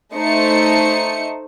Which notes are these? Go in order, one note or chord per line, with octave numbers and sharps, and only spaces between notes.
A3 D#4 C5 C#7